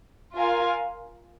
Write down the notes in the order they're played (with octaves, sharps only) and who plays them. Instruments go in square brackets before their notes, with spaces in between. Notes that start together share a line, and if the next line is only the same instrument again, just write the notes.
[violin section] F4 A#4 F5 G#5